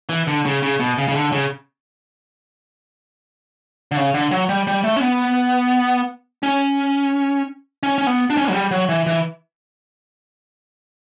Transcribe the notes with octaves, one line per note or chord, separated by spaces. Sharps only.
E3
D3
C#3
C#3
B2
C#3
C#3
D3
C#3
D3
C#3
D3
F#3
G3
G3
A3
C#4
B3
C#4
C#4
C#4
B3
D4
C#4
D4
F#3
G3
F#3
E3
E3